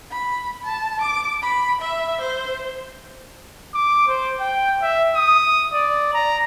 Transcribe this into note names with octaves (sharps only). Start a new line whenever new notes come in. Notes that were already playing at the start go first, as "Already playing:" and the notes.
B5
A5
D6
B5
E5
C5
D6
C5
G5
E5
D#6
D5
A#5